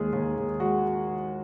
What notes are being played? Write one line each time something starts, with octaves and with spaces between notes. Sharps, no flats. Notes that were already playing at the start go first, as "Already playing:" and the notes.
Already playing: D#2 G#3 G#4
D#2
D#2
G#3 F#4